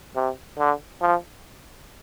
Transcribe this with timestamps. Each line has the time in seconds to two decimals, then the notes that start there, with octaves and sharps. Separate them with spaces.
0.16 C3
0.58 D3
1.01 F3